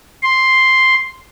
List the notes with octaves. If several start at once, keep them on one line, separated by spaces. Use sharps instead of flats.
C6